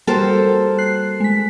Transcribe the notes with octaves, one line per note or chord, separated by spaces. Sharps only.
G3 A#3 F#4 A4 A#4 C5
F#6 C7
G#3 B6